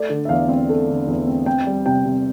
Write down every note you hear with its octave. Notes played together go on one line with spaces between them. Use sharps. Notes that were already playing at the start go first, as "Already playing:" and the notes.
Already playing: A3 D5
D3
E5
E2 F5
C4
A3
D3
E2
C4
C4 G5
G3
C3 G5
C3